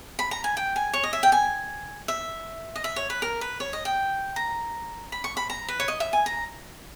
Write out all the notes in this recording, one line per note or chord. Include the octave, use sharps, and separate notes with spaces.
B5
A#5
G#5
G5
G#5
C#5
D#5
E5
G5
G#5
E5
D#5
E5
C#5
B4
A#4
B4
C#5
D#5
G5
A#5
B5
C#6
B5
A#5
B4
C#5
D#5
E5
G#5
A#5